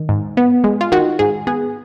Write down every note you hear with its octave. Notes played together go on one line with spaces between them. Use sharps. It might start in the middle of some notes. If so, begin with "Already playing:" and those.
Already playing: D#3
G#2
B3
G#3
F4
D#3 F#4
G#2 G#4
B3 G#4